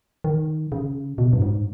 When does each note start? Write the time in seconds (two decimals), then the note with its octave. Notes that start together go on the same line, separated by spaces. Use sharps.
0.24 D#3
0.72 C#3
1.18 B2
1.33 G2
1.42 G#2